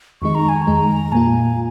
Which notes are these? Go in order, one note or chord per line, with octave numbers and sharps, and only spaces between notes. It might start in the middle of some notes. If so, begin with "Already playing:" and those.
F2 D#3 G#3 D#4 C#6
A#5
G#5
A#5
F2 D#3 G#3 D#4
A#2 A#3 F4 G#5